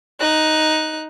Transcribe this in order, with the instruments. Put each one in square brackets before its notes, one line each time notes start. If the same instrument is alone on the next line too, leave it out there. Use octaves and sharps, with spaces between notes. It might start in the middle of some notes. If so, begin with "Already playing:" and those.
[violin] D#4 F#6